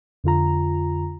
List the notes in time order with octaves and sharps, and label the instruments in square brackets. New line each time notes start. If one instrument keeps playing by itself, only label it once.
[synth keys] F2 D3 F4 A#5